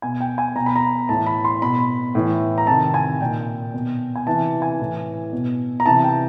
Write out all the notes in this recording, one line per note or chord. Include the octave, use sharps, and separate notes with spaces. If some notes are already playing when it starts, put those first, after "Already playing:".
B2 G#5
G5
G#5
B2 A#5
B5
A#5
A2 E3 A5
B5
C6
B2 B5
A2 E3
A#5
C3 D#3 A5
G#5
A#2 G5
B2
G#5
C3 E3 A5
G#5
A2 E3
B2
A#5
C3 E3 A5
G5